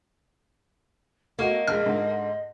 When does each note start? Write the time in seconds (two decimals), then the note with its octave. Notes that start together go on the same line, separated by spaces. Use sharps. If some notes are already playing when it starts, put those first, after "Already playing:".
1.39 A3 A#3 F#4 D#5
1.68 A#1 G#3 F6
1.86 G#2 D3